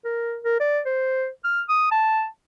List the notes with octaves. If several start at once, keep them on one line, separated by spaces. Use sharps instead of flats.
A#4
A#4
D5
C5
F6
D#6
A5